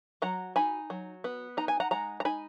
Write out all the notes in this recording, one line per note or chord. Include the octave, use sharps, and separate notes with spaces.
F#3 F#5 A#5
D#4 G#5 B5
F#3
B3
D#4 A#5
G#5
F#5 A#5
G#3 F#5 A#5
A#5
D#4 G#5 B5